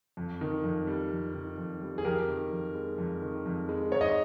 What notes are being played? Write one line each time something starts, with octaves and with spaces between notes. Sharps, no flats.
F2
D#3
F2
G3
F2
D#3
F2
G3
G#4
F2 G4 A#4
D#3
F2
G#3
F2
D#3
F2
G#3
G#2 C#5
D#5